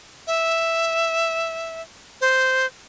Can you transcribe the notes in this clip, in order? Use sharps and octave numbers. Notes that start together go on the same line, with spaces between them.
E5
C5